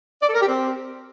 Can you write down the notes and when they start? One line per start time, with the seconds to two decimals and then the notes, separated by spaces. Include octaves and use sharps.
0.22 D5
0.28 A4
0.34 A#4
0.40 G4
0.46 C4